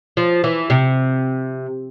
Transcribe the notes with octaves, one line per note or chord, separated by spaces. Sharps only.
F3
E3
C3